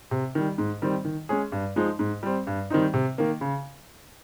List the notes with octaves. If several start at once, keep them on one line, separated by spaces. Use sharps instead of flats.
C3
D#3 G3
G#2
D#3 G3 C4
D#3
G#3 C#4 G#4
G2
F3 G#3 D#4
G#2
G3 C4
G2
D#3 G3 C4 D#4
C3
D#3 A#3
C#3